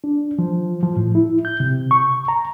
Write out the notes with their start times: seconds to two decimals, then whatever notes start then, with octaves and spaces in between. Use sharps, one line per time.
0.04 D4
0.39 F3
0.83 F3
0.96 A2
1.15 E4
1.45 G6
1.60 C3
1.91 C#6
2.28 A#5